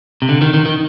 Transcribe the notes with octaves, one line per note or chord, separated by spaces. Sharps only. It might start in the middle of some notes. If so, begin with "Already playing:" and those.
C3
D3
D#3
D#3
D#3